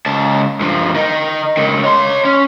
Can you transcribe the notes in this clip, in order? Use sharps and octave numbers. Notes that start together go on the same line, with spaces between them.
C#2 A5
G2 F3
D#3 D#4
C#2 D#3
C#5 C6
C#4